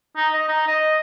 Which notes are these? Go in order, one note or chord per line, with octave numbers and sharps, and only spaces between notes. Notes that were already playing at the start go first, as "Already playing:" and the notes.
D#4
D#5
D#4
D#5